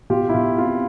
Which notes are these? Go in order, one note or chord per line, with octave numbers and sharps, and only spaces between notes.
B2 F4 G4
E4
B2 F4
C4 F4